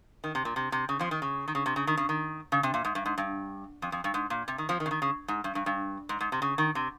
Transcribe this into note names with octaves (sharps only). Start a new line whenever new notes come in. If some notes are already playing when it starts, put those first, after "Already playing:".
D#3
C3
A#2
C3
C3
C#3
F2 F3
D#3
C#3
D#3
C#3
C3
C#3
D#3
C#3
D#3
C#3
C3
A#2
G#2
G2
G#2
G2
F2
F2
G2
G#2
A#2
C3
D#3
F2 F3
D#3
C#3
D#3
C#3
G#2
G2
G2
G2
G#2
G#2
C3
C#3
D#3
C3